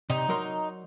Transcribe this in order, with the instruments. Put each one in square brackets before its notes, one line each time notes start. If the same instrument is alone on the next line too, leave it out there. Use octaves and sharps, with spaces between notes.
[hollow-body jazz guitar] C3 [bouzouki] D#4
[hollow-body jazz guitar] F#3 A#4 C6